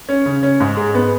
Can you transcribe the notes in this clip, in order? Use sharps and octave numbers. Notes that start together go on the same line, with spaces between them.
C#4
C#3
C#4
G#2
G#4
B3